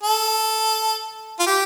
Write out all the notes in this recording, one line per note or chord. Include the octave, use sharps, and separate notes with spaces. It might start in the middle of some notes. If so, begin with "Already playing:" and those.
A4
F4
G4